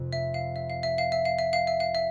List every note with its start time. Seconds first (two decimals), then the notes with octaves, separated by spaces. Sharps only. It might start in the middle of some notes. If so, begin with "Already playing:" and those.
Already playing: F1 F2 C3 F3
0.13 E5
0.34 F5
0.56 E5
0.70 F5
0.83 E5
0.98 F5
1.12 E5
1.25 F5
1.39 E5
1.53 F5
1.67 E5
1.80 F5
1.95 E5